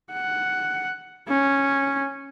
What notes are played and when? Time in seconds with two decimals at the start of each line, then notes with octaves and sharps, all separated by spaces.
0.12 F#5
1.28 C#4